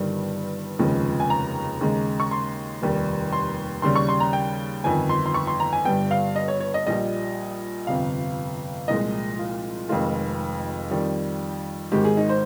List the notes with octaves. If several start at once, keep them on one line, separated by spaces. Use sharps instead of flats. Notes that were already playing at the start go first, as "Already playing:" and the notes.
Already playing: G1 G2 D#3 G3
F1 D#2 C#3 F3 G#3
G#5
A#5
D#2 C#3 G#3
C#6
C6
F1 D#2 D#3 G3
C6
D#2 C#3 G3 C6
C#6
C6
A#5
G5
G1 F2 D#3 G#5
C6
C6
C#6
C6
A#5
G#5
G1 G2 G3 G5
F5
D#5
C#5
C#5
D#5
A#1 A#2 G3 D#5
G1 F2 C3 F5
C2 A#2 F3 G#3 D#5
F4
F1 F2 D#3 G#3 F4
F2 D#3 G3
G#1 G#2 D#3 G#3 G4
G#4
D#4
C5